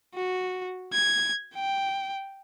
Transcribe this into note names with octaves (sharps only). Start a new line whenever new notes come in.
F#4
G#6
G5